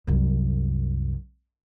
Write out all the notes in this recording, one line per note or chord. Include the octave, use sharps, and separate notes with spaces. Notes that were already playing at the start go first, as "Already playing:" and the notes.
C2 F#2